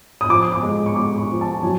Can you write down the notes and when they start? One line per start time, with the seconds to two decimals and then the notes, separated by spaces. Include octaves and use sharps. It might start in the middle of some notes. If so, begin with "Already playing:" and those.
0.21 D#6
0.29 F3 D6
0.52 D6
0.63 G#3
0.86 C#6
0.96 G#3 D6
1.18 C#6
1.30 F3
1.41 A5
1.63 F#3 G#5